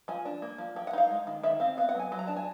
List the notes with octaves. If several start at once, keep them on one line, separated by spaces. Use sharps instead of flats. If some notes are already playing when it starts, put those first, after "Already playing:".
F3 G#5
D4
A#3
F3
F3 G5
F#5
D#4 F5
G#3
D#3
D#3 E5
C4 F5
B3 F5
F#5
F#3 G#5
F#3
A#5
D4 A5
G#5